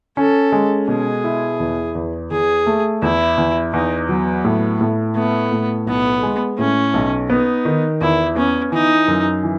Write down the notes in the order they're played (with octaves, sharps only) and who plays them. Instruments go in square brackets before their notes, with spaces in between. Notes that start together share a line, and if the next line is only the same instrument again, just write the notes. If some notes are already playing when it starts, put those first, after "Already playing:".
[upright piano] C#4 [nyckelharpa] A4
[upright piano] G#3
[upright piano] B2 [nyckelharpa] G#4
[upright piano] E4
E2
E2
[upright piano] E2 [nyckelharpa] G#4
[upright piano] A3
[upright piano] E2 [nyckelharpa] E4
[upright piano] E2
[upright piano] E2 [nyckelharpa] D#4
[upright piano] F#3 [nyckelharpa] B3
[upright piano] A2
A2
[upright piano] A3 [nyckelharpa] B3
[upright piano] A2
[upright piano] B1 [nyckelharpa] B3
[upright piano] G#3
[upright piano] A2 [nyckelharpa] C#4
[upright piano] B1
[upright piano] B3 [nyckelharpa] D#4
[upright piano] D#3
[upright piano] E2 [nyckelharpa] E4
[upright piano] B3 [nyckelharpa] C#4
[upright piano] E3 [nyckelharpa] D#4
[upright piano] F#2
E3